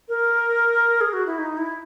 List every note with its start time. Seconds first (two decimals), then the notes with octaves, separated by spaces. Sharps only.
0.09 A#4
1.01 G#4
1.13 F#4
1.26 E4
1.38 D#4
1.57 E4